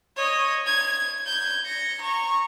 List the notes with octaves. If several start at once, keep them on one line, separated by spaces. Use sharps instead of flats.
C#5 D#5
G#6
G6 G#6
A#6 C#7
A#5 C#6